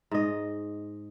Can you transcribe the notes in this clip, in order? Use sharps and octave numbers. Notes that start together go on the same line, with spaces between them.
G#2 D#5